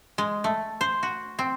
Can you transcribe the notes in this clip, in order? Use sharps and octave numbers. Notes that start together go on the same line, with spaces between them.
G#3
A3
C5
F#4
C4